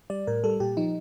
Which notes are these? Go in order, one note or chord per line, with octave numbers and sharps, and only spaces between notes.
G3 D5
A2 A#4
G3 A4
A#2 G4
F3 D#4